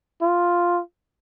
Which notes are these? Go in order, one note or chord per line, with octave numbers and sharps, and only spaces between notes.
F4